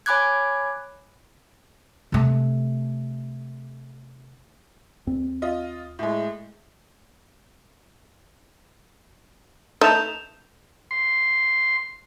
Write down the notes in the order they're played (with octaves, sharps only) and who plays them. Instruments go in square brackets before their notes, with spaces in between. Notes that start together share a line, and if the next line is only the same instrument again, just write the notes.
[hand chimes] C#5 G#5 B5 D6 F#6 G#6
[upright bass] C3 A3
[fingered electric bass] D#2 C4
[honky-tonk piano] F4 D#5
A2 G#3
[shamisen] A3 D#4 [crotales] G6 E7 F7
[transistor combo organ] C6